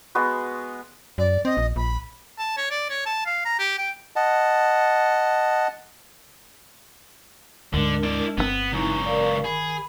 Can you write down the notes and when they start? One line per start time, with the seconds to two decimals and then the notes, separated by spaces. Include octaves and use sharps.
0.15 G#3 B3 F#4
1.18 F#2 D5
1.45 C4 D#5
1.57 A#1
1.76 A#1 B5
2.38 A5
2.57 C#5
2.71 D5
2.90 C#5
3.06 A5
3.26 F5
3.45 A#5
3.59 G4
3.78 G5
4.16 D#5 F#5 A5
7.74 D2 G#2 D3 G#3 D4 A#4
8.03 E4 D5
8.38 G1 D3 B3 C4
8.73 C#2 F#3 D#4 E4
9.06 A#4 D5 F5
9.44 D#3 G#4 B5